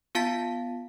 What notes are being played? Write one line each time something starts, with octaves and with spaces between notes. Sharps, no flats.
B3 F4 F5 A5 A6 B6